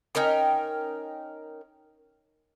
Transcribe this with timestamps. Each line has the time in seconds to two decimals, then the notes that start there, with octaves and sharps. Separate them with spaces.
0.15 C#4 D#4 A#4 G5